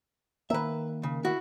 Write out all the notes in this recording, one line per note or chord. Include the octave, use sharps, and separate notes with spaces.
D#3 A#3 B4 E5
C#3
E4 F#4